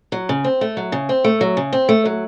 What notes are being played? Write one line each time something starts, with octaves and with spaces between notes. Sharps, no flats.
F#3
C#3
C4
A3
F#3
C#3
C4
A3
F#3
C#3
C4
A3
F#3